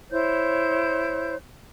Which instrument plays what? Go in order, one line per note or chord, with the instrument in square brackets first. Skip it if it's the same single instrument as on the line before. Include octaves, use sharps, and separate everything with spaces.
[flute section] E4 C5 C#5 G6